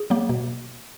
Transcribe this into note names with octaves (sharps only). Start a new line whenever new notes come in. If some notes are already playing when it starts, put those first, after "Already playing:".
Already playing: G#4
F#3 A#3
B2